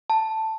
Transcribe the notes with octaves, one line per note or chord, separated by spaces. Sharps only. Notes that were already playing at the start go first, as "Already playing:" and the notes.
A5